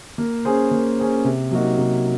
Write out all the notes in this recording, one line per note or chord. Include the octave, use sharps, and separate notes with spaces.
A#3
C#4 G#4 C5
A#3
C#4 G#4 C5
C3
F#3 A#3 D#4 F#4
C3